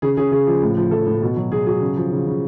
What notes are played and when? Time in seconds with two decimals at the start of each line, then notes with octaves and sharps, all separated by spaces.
0.02 C#3 G#4
0.17 C#3 G#4
0.32 C#3 G#4
0.47 F3
0.62 A2
0.77 F3
0.91 F3 A4
1.07 A2
1.22 B2
1.36 F#3
1.52 B2 G#4
1.66 F#3 G#4
1.81 C#3
1.96 F3
2.11 C#3
2.26 C#3